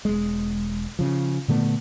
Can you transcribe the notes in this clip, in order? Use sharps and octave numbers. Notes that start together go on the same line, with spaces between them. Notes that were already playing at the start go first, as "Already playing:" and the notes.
E1 G#3
C#3 F3
A#2 D3 A3 B3